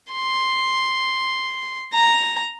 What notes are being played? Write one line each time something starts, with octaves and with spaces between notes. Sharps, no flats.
C6
A#5